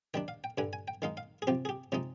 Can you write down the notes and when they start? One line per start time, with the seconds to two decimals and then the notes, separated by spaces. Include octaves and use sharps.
0.14 D#3 G3 D4 G5
0.28 F5
0.44 G5
0.58 G2 D3 G3 G#5
0.73 G#5
0.88 G5
1.02 D#3 G#3 D#4 F5
1.17 F5
1.42 G#4
1.47 C3 F3 C4 G4
1.65 G#4
1.69 G4
1.92 C3 F3 G#3 D#4